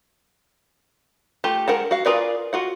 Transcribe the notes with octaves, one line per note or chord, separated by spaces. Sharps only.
A3 F4 G4 A5
G#3 A#4 F#5 A5
F#4 F5
F4 G#4 A#4 B4 D5
F4 F#4 F#5